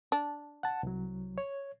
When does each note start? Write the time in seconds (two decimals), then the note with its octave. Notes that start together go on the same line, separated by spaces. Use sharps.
0.12 D4
0.63 F#5 A5
0.83 C2 F#3
1.38 C#5